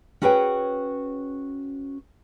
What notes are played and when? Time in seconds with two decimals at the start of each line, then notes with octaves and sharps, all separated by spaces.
0.22 C#4 F#4 G#4 B4 C#5 G5